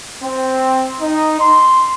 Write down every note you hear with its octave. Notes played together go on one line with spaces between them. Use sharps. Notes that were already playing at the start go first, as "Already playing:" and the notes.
C4
D#4
C6